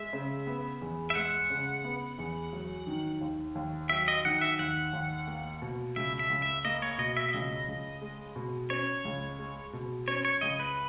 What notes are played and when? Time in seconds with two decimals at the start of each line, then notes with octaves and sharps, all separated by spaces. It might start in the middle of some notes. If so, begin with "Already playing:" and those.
Already playing: G#3 E5
0.13 C#3
0.47 B3
0.82 E2
1.10 E5
1.15 G#3 F#5
1.50 C#3
1.84 B3
2.19 E2
2.53 F#3
2.87 D#3
3.21 D#2
3.55 D#2
3.89 F#3 E5
4.08 D#5
4.25 D#3 F#5
4.41 E5
4.59 D#2 F#5
4.93 D#2
5.27 A#3
5.62 B2
5.96 C#2 E5
6.19 E5
6.30 C#2
6.42 E5
6.65 A#3 D#5
6.82 C#5
6.98 B2 D#5
7.17 E5
7.29 E5
7.33 C#2 D#5
7.68 C#2
8.01 G#3
8.36 B2
8.70 C#4 C#5
9.05 C#2
9.39 G#3
9.73 B2
10.08 C#4 C#5
10.25 C#5
10.41 C#2 D#5
10.60 B4